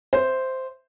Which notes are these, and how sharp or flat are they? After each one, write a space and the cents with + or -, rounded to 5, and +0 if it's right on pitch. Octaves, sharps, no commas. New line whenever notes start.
C5 -5 E5 +0